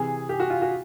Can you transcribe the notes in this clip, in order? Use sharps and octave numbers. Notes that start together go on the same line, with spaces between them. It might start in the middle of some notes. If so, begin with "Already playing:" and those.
Already playing: C3 E3 G#4
G4
F#4
F4
F#4